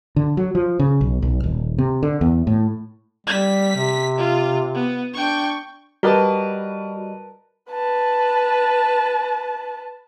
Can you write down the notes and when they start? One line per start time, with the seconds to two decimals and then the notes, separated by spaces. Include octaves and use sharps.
0.16 D3
0.37 F#3
0.55 F3
0.79 C#3
1.01 B1
1.22 B1
1.44 D#1
1.78 C3
2.03 D3
2.21 E2
2.47 A2
3.27 G3 B6
3.76 C3
4.18 F4
4.74 B3
5.14 D4 G5 C#6
6.03 G3 F#4 A#4 B4 D5 D#5 A5
7.71 B4 A5